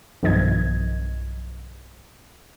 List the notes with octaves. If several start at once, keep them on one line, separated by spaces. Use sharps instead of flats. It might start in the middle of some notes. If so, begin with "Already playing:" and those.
B1 G2 D#3 F3 D#5 G#6